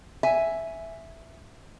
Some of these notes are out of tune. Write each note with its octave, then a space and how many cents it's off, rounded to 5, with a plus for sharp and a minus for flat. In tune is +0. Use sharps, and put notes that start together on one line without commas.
E5 +0 G#5 +0